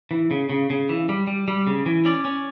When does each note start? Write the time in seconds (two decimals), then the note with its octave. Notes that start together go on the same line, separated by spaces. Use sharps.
0.11 E3
0.31 C#3
0.50 C#3
0.70 C#3
0.89 E3
1.09 G3
1.27 G3
1.48 G3
1.67 C#3
1.86 E3
2.05 C#4 D5
2.25 C#4